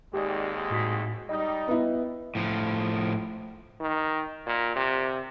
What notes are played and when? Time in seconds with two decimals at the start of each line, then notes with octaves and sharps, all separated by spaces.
0.14 G#1 D#2 G#3 G4 D5
0.70 A2 F#4 B6
1.29 G3 D#4 D#5
1.68 B3 E4
2.35 A2 F3
3.80 D#3
4.46 A#2
4.76 C3